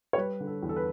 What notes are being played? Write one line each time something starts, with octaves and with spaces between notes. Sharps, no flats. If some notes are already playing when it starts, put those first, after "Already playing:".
C#5
G3 B4
D3
A4
E2
A4
B4